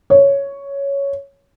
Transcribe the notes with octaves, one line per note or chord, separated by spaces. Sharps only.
C#5